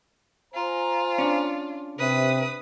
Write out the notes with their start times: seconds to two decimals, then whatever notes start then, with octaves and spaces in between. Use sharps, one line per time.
0.54 F4 C5 G#5 A#5
1.18 C#4 D4
1.99 C3 B4 D#6